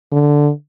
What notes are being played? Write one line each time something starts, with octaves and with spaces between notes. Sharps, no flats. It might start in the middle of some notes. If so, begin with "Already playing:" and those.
D3